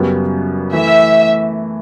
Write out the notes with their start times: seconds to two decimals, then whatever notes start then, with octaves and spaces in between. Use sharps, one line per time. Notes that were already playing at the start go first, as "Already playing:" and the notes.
Already playing: F#2 C#3 G3 B3 F#4
0.73 E3 A3 E4 E5